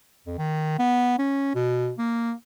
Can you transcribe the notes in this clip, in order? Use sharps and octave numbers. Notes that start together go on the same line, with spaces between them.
F2
D#3
B3
C#4
B2
A#3